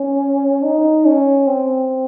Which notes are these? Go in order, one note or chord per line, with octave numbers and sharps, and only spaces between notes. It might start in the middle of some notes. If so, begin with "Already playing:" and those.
Already playing: C#4
D#4
C#4
C4